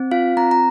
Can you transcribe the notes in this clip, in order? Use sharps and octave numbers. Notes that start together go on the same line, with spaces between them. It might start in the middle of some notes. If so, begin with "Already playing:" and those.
Already playing: C4
F4 F5
C4 A#5
A#5